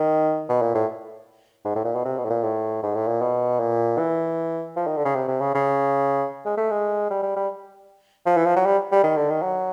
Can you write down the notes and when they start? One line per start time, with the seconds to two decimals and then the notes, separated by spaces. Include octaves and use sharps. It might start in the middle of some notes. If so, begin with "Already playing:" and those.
Already playing: D#3
0.49 B2
0.62 A#2
0.75 A2
1.65 G#2
1.75 A2
1.84 A#2
1.95 B2
2.05 C3
2.18 B2
2.25 A2
2.30 A#2
2.44 A2
2.83 G#2
2.95 A2
3.07 A#2
3.21 B2
3.60 A#2
3.98 E3
4.76 F3
4.87 D#3
4.96 D3
5.05 C#3
5.15 C3
5.28 C3
5.41 C#3
5.55 C#3
6.45 G#3
6.57 A3
6.71 G#3
7.10 G3
7.23 G3
7.36 G3
8.26 F3
8.37 E3
8.46 F3
8.56 F#3
8.66 G3
8.92 G3
9.04 D#3
9.16 D3
9.30 D#3
9.42 F#3